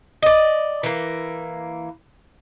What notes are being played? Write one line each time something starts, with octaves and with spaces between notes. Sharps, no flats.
D5 D#5
E3 A#3